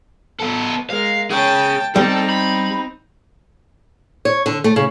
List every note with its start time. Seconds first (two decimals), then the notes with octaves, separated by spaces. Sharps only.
0.40 B3 A4
0.90 G#3 A#4 F5
1.30 G#4 C#5 G5 A5
1.96 G3 C4 D#4 A4
2.30 B5
4.25 C#5
4.46 D3
4.64 A3
4.76 C#3